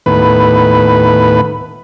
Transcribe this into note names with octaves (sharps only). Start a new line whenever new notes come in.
D#2 A2 B3 B4